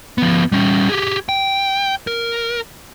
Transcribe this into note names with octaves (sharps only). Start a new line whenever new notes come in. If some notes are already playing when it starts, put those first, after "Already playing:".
F3 B3
G3 C#4
G4 G#4
G5
A#4